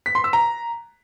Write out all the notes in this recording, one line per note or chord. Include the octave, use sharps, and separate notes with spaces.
B6
C6
E6
A#5